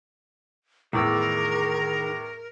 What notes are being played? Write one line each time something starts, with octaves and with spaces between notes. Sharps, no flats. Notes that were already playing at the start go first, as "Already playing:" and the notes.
E2 A2 D#3 G#4 A#4 D5 E6